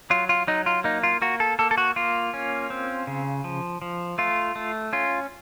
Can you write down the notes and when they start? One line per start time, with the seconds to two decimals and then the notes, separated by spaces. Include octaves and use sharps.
0.10 F#3 F4
0.29 F4
0.47 F#3 D#4
0.66 F4
0.84 A#3 D#4
1.03 F4
1.22 A#3 F#4
1.40 A4
1.59 A#3 A4
1.71 A4
1.78 F#4
1.96 A#3 F4
2.34 C#4
2.70 C4
3.07 C#3
3.44 F3
3.82 F3
4.18 A3 F4
4.56 A3
4.93 C#4 F4